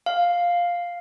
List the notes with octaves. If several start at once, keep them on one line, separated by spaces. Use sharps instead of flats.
F5